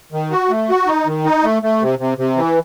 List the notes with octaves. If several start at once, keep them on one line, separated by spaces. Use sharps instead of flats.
D#3
F#4
A3
F#4
D#4
D#3
D#4
A3
A3
C3
C3
C3
E3